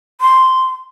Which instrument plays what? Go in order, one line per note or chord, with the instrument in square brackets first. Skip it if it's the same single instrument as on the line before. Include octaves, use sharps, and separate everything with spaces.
[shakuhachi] C6